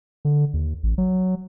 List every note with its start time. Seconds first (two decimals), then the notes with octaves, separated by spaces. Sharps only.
0.25 D3
0.53 D#2
0.83 A1
0.98 F#3